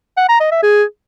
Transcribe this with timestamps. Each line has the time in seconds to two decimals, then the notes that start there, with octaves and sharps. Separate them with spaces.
0.17 F#5
0.29 A#5
0.40 D#5
0.51 E5
0.63 G#4